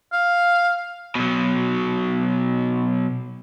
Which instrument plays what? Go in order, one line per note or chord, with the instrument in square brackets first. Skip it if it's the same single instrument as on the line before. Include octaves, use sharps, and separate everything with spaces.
[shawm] F5
[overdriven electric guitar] B2 F#3